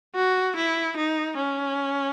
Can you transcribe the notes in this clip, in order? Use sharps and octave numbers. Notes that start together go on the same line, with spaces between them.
F#4
E4
D#4
C#4